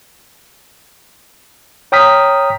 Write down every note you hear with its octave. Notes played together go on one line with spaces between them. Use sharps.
C#5 G5 A#5 D#6 F6 B6